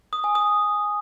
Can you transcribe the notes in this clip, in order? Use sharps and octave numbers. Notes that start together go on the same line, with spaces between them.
D#6
G#5
D#6